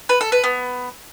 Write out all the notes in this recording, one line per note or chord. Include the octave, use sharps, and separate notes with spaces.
B4
A4
B4
B3